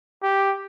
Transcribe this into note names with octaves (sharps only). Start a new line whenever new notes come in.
G4